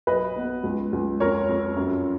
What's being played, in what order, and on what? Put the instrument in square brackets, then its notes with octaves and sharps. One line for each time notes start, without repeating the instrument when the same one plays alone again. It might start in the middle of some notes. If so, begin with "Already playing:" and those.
[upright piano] B1 B4 D#5
B3
C#2
C#2
F2 A#4 C#5
F2
F#2